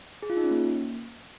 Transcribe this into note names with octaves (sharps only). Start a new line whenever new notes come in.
G#4
F4
D#4
C#4
A#3